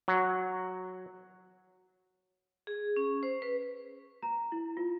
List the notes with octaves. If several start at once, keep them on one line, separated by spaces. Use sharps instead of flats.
F#3
G#4
C#4
C5
B4
A#5
E4
F4